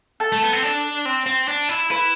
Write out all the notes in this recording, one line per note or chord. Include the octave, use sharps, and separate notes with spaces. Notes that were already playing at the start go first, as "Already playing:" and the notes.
A4 A5
A3
B3
C4
D4
C4
C4
D4
E4
E4 B4 B5